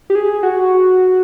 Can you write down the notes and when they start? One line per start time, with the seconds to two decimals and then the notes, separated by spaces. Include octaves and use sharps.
0.10 G4
0.15 G#4
0.43 F#4